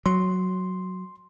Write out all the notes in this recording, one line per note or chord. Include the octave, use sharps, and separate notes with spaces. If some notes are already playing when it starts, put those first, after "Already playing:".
F#3 C6